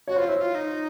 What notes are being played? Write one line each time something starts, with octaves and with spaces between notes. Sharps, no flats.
F#4 C#5
F4 C5
E4 C#5
F4
D#4